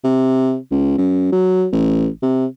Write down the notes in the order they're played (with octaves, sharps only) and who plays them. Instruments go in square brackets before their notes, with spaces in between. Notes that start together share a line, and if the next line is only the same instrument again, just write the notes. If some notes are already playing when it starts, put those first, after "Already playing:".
[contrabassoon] C3
C#2
F#2
F#3
A1
C3